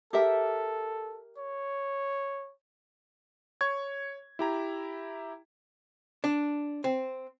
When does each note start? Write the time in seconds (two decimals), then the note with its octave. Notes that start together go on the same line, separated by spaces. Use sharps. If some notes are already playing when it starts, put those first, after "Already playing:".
0.13 G4 A4 A#4 E5
1.38 C#5
3.61 C#5 C#6 G#6
4.39 E4 G4 A#5
6.24 D4
6.84 C4